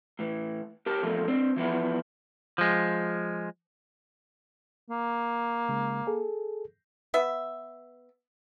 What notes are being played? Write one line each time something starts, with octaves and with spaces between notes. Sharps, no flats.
A2 E3
G4 A#4 A5
E2 A#2 F3 A3 A#3
C4 D4
E3 F3 B3 E4
F3 G#3
A#3
C#3 G#3
G#4 A4
B3 E5